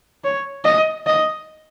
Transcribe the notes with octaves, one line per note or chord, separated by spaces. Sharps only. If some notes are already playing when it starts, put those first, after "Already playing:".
C#5
D#5
D#5